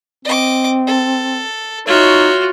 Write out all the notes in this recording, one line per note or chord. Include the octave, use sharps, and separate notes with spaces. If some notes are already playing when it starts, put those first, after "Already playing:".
C4 D#5 D6
A4
D#4 F4 F#4 C#5 E5